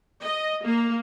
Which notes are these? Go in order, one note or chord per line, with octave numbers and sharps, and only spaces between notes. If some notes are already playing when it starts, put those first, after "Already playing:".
D#5
A#3